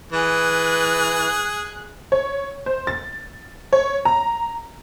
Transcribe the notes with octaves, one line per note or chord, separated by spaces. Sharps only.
E3 G#4 F#6
C#5
C5
A6
C#5
A#5